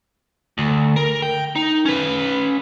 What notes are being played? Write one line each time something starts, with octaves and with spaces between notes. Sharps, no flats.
D2
A#4
G5
D#4
C#4 B4